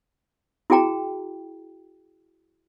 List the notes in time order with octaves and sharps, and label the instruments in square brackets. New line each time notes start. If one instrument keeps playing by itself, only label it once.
[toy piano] E4 F#4 G#4 G5 A#5